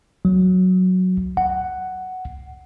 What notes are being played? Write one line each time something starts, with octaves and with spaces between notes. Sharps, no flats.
F#3
F#5